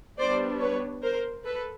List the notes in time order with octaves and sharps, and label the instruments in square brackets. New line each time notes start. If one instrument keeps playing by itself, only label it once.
[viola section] G3 B3 D4 C5 D5
B4 C#5
A#4 C5
A4 B4